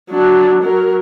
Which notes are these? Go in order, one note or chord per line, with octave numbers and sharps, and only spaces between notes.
F#3 D4
F#3 A#4